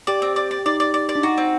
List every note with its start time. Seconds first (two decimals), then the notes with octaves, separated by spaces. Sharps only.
0.07 G4 D5
0.22 C4
0.36 D5
0.51 D5
0.66 D#4 D5
0.80 D5
0.94 D5
1.09 D5
1.16 D4
1.23 D#4 F#4
1.38 C4